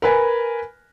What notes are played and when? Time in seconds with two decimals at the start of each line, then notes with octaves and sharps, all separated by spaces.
0.02 A#4 B4 G#5 B5